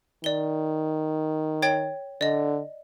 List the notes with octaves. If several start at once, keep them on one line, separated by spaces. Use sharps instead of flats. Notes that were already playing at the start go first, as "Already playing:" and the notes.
D#3 D5 G7
C#5 G5 A6
D3 D5 D#5